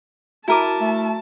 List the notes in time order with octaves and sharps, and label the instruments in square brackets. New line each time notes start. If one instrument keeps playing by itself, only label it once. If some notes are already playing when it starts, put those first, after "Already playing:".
[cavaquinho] E4 A#4 D6 [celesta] F#4 A#5 D#7 [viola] A5
[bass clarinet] A3